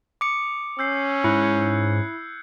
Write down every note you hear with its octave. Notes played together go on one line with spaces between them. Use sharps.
D6 D#6 C#7
C#4 E6 G6 C7
G#2 E4 F#6 G#6 C#7